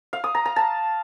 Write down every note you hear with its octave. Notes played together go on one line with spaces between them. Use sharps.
F5
D#6
A#5
A#5
A5